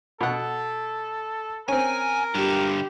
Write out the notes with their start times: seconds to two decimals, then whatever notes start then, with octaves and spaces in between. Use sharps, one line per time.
0.21 B2 A4 F#5
1.68 C4 C#4 A#4 G#5
2.35 G2 D3 G4